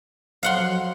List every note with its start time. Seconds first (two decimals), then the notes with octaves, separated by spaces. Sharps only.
0.43 F3 F#3 F5 F#5 C6